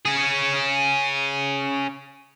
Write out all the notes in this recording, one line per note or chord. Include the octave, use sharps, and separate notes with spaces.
C#4 G#4